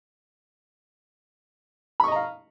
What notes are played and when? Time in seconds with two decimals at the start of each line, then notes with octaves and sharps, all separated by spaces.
2.00 B5
2.04 C#6
2.08 D#5
2.12 A#5
2.16 F5